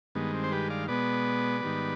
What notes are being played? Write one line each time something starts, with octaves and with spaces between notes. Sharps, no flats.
G2 D#3 G#3 B3
C4
C5
G4 B4
D5 F5
B2 G#3 B3 B4 D5
G#2 D#3 G3 B3